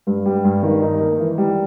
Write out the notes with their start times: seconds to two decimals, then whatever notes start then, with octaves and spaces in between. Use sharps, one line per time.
0.07 G2
0.26 G3
0.44 G2
0.63 D#3
0.82 D#4
1.00 A#3
1.19 E3
1.38 G3